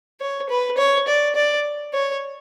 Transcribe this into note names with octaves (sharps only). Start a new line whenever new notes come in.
C#5
B4
C#5
D5
D5
C#5